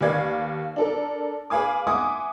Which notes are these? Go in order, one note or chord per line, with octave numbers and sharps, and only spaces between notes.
D#2 A#3 B4 D5 F5 G#6
D4 A4 A#4
G#4 B4 F5 G#5 D6
E5 F#5 G#5 C6 D6 D#6